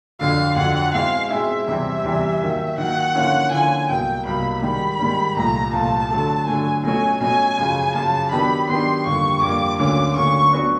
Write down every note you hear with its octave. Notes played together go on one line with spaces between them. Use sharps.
F2 D3 F#3 F5
F2 D3 F#3 F#5
B2 G#3 C4 E4 G#4 F5
B2 G#3 C4 E4 G#4 E5
E2 C3 E3 G3 C4 E5
E2 C3 E3 G3 C4
D#3 F#3 A#3
D#3 F#3 A#3 F#5
D3 F3 A#3 C#4 E4
D3 F3 A#3 C#4 E4 G#5
C2 B2 F#3 A#3 G5
C2 B2 F#3 A#3 B5
G#2 D#3 G3 B5
G#2 D#3 G3
C2 A#2 F3 A3 A#5
C2 A#2 F3 A3 A5
D3 F#3 A3
D3 F#3 A3 G#5
B2 F#3 A3 C#4 F#4 G#5
B2 F#3 A3 C#4 F#4 G#5
F#2 C#3 F3
F#2 C#3 F3 A5
D#3 F#3 B3 D4 G4 B5
D#3 F#3 B3 D4 G4 C6
F2 D3 G3 A#3 C#6
F2 D3 G3 A#3 D6
D2 D3 F#3 A#3 C#4 D6
D2 D3 F#3 A#3 C#4 C#6
F#3 B3 D4 F#4 B4